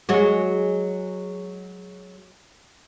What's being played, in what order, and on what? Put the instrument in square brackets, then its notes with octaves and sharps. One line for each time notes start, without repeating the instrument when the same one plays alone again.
[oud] F#3 G#3 F#4